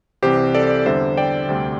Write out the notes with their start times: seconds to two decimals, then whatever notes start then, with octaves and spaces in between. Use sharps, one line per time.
0.23 C2 C3 E3 C4 G4 C5
0.55 A4 D5
0.86 E2 D3 G3 C5 E5
1.17 D5 G5
1.48 D2 C3 G3 C4